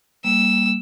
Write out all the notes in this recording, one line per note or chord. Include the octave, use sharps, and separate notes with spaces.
G3 A#3 E6